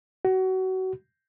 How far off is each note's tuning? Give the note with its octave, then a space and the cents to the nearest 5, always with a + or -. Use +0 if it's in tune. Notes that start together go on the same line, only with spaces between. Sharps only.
F#4 +25